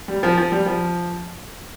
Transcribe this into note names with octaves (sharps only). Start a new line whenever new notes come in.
G3
F3
F3
G3
F3